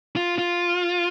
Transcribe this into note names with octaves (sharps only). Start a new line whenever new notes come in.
F4
F4